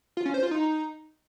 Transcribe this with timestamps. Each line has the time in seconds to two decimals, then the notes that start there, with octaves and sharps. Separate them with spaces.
0.17 F4
0.26 C#4
0.34 C5
0.43 F4
0.51 D#4